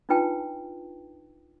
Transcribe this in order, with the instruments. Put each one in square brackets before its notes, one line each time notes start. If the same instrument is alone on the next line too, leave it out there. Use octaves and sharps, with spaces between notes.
[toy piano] D4 D#4 F4 B4 G5 A5